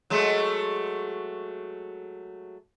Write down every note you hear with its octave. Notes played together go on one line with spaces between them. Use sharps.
F#3 G#3 A3